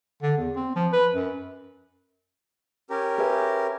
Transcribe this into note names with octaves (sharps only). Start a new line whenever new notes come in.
D3
E2
C4
F3
B4
F#2
C#4 G4 A#4
G#4 B4 E5